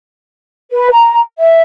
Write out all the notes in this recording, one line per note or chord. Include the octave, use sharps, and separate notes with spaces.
B4
A#5
E5